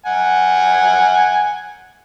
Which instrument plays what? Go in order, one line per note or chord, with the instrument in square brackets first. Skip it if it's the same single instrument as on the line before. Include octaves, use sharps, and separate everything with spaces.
[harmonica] F#5 G#5